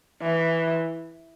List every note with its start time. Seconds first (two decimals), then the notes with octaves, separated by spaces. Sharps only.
0.21 E3